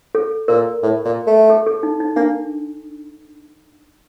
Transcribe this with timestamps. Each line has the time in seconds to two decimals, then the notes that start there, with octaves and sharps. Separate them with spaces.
0.15 A4
0.48 A#2 A#4
0.83 A2
1.05 A#2
1.27 A3
1.50 A4
1.67 A4
1.83 D#4
2.00 D#4
2.16 A#3 D4